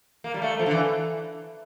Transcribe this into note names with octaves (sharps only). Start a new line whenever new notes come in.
A#3
G3
A3
F3
D3
E3